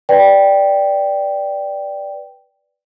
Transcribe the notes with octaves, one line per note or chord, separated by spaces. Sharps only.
B4 D5 G5